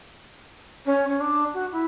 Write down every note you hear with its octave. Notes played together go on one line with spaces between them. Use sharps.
C#4
C#4
D4
F#4
E4